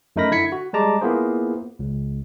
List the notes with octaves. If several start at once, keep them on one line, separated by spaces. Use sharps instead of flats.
F#2 A3 D#4 A#4 B5 A#6
D3 E4 G#6 B6 C#7
F#4
G3 G#3 A5 A#5 D6
A#3 B3 E4 F4 G#4 C5
C#2